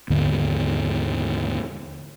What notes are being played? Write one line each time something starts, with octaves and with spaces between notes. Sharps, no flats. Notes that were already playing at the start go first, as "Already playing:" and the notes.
D#2 G#2 D3 B3